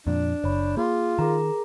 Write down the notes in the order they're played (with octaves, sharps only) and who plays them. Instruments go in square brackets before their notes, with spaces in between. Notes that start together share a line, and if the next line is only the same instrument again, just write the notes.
[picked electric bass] F2 A#2 [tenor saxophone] D4
[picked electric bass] F#1 [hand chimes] C#5 B5
[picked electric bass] A#3 [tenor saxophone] F4 [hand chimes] G#4
[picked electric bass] D#3 [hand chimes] G#4 A#4 A#5